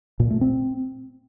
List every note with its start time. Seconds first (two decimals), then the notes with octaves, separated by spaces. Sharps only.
0.20 A#2
0.30 A3
0.41 C4